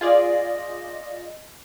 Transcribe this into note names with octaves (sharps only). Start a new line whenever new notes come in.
F4 G#4 D5 D#5